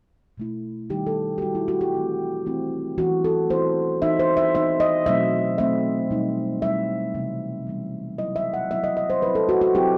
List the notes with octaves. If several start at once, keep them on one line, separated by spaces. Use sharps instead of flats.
B2 A3 E4
D#3 G3 D#4 G4
A4
G4
D#3 G3 D#4 F#4
E4
F#4
G4
E3 A3 C4 E4
E3 A3 C4 E4
E3 B3 E4 F#4
A4
E3 B3 E4 C5
E3 B3 D#4 E5
C5
E5
E3 B3 D#4 E5
D#5
B2 F#3 A3 C4 E5
B2 F#3 A3 C4 E5
B2 G3 D#4
B2 G3 D#4 E5
C3 E3 G3 B3
C3 E3 G3 B3
F#3 B3 E4 D#5
E5
F#5
F#3 B3 E4 E5
D#5
D#5
C5
F#3 C4 E4 B4
A4
F#4
F#4
F#3 C4 E4 G4